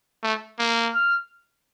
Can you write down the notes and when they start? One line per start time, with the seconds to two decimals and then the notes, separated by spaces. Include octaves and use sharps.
0.23 A3
0.59 A#3
0.94 F6